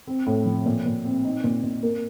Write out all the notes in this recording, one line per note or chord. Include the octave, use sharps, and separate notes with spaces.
C4
A2
F3
A#2
A#2
C4
D#4
A#2
A#2
A#3